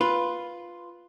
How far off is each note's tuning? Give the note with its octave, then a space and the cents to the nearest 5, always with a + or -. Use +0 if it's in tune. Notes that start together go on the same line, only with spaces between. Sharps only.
F4 +0 B4 +0